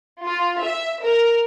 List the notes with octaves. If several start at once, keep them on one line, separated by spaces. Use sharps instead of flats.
F4
E5
A#4